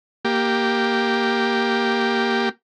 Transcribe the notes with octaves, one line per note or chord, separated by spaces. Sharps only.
A#3 G4